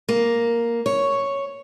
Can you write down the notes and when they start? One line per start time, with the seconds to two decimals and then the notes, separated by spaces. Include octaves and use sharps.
0.09 A#3
0.86 C#5